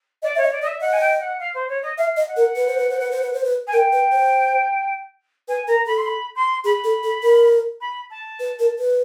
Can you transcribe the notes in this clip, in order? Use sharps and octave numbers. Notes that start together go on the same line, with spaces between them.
D5 D#5
C#5 E5
D#5
D5
D5 D#5
E5
D#5 F#5
G#5
G5
F#5
F5
C5
C#5
D#5
E5 F5
D#5
F#5
A#4
B4
C5
B4
C5
B4
C5
B4
C5
B4
G#5
A#4 G5
B4
C5
B4 G#5
A#4 A#5
A4 B5
C6
B5
C6
G#4 B5
A4
A4
A#4
B5
A5
B4
A#4
B4